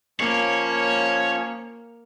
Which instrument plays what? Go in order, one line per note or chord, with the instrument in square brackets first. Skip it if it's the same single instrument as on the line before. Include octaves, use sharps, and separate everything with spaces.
[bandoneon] F3 C#4 [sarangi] A#3 [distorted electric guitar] C#5